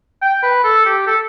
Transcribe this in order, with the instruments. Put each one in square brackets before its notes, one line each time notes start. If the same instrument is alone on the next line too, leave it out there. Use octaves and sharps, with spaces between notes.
[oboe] G5
B4
A4
G4
A4